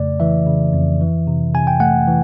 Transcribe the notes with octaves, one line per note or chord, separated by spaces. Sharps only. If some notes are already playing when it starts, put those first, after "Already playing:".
Already playing: F2 C#3 A3 D5
E3 E5
C#3
F2
E3
C3
C3 G#5
G5
A3 F#5
E3